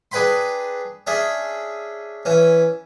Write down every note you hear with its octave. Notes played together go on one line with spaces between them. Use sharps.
D4 G#4 B4 G5 B5 C6
C#4 D4 G#4 E5
E3 C#4